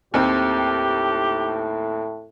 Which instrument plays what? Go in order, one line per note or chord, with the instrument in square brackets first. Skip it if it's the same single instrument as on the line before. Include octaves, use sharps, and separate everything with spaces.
[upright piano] D#2 C4 [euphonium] A2 [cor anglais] G4